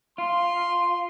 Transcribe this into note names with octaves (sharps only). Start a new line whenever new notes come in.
F4 C6